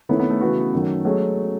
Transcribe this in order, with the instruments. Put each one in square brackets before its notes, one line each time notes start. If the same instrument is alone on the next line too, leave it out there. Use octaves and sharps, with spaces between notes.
[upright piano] D#3 A3 C#4 E4 [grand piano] B3
[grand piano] B3
A3
[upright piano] C#3 E3 B3 F#4
F#2 D#3 F#3
[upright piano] F#3 A3 C#4 F#4 [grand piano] G#3